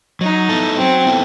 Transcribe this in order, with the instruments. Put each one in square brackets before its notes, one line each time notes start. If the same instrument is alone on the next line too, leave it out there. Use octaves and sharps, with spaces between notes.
[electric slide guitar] F#3 [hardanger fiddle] D#4
[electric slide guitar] B3 E4 A4
[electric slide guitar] F#3 [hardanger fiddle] C4
[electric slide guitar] B3 E4 A4